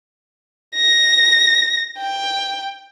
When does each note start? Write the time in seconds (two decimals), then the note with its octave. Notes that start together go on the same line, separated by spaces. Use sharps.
0.75 A#6
1.98 G5